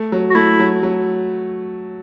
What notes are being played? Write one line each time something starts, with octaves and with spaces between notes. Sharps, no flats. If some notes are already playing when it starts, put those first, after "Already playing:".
Already playing: A3
F#3
F#4
A3 E4
F#3
F#3